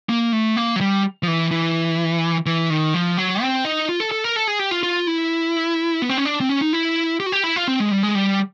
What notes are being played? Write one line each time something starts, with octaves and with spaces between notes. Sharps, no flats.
A#3
A3
A#3
F#3
G3
F3
E3
E3
E3
D#3
F3
F#3
C4
D#4
F4
A4
A4
A#4
A4
G#4
G4
F4
F4
E4
B3
C4
C#4
D4
C4
C#4
D#4
E4
G4
F#4
G4
E4
F4
C4
G#3
G3
G#3
G3